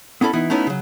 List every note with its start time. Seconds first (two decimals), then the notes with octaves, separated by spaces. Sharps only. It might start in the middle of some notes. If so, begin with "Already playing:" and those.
0.21 B3 C#4 E4 A4 B5
0.33 E3 B3 D#4 E4
0.50 A3 B3 C#4 D#4 E4
0.67 C#3 F#3